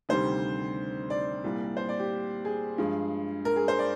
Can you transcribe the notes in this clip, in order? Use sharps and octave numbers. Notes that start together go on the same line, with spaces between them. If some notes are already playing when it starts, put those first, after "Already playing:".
D2 C3 D#3 G3 C5
D5
C2 A#2 G3
C5
D5
G4
G#4
G2 F3 G#3
A#4
G#4
C5
D5